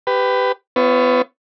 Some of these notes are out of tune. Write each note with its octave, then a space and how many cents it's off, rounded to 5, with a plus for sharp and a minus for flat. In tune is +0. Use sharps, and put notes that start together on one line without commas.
G4 +0 B4 +20
B3 +30 F4 -45 C#5 -5